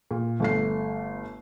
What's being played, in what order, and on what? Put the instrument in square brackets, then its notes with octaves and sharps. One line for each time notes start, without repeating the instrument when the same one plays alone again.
[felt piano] A#2
G1 A3 C7